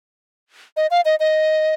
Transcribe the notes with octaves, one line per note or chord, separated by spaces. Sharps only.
D#5
F5
D#5
D#5